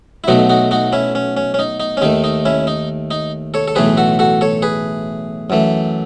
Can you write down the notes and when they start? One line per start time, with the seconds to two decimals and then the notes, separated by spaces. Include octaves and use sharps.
0.24 E4
0.27 B1 B2 F#3 A3 D#4 F#4
0.49 D#4 F#4
0.71 D#4 F#4
0.93 C#4 E4
1.15 C#4
1.37 C#4
1.54 C#4
1.59 D#4
1.80 D#4
1.97 C#4
2.01 D#2 D#3 A3 D#4
2.24 D#4
2.45 C#4 E4
2.67 D#4
3.11 D#4
3.54 A4 C#5
3.68 A4
3.75 B1 A2 E3 A3 G#4 B4
3.97 F#4 A4
4.19 F#4 A4
4.41 A4 C#5
4.62 G#4 B4
5.50 F#2 E3 A3